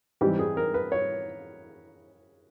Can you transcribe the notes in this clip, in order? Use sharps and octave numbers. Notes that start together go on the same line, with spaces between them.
G#2 E3 G3 C4 D#4 G4
G#4
A#4
B4
C#5